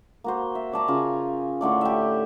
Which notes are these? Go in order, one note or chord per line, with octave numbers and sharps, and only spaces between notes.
A#3 F#4 C5
E5
C#5 D5 A5 A#5
C#3 F4 G#5
A2 D3 A3 D5
G4 E5